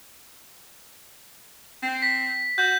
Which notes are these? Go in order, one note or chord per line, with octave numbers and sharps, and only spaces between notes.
C4
B6
F#4 G6